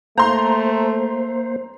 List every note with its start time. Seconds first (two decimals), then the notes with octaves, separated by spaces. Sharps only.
0.18 A3 A#3 C5 A#5 C6